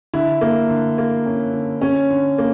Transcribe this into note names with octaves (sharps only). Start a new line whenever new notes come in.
D3 E4
A#3
D3
A#3
C#4
D3
C#4
D3
A#3